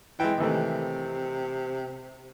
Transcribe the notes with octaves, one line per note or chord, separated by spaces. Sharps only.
E3 G#3 G5
C3 D#3 E3 A3